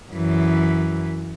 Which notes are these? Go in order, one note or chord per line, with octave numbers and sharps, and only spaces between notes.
F#2 E3